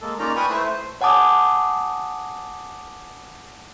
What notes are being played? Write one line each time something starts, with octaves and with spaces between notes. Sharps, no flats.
G#3 A#3 A4
A#3 C#4 D#4 F4 D5 A#5
B4 G5 G#5 B5 C#6 D#6
A3 E4 B4 C5
C5
C#5 F#5 G#5 A5 D6 D#6